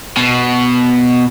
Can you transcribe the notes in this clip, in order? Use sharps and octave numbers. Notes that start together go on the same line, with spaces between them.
B2